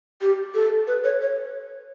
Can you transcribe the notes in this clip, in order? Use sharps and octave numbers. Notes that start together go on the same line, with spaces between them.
G4
A4
B4
C#5
C#5